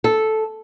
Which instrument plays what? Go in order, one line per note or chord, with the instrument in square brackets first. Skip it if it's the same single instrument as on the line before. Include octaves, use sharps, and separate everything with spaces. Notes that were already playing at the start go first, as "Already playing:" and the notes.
[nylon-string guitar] A4